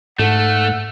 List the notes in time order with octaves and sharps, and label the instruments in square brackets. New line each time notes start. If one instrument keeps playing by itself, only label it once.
[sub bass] G#2 [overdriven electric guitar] A3 [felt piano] A4 [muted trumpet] F#5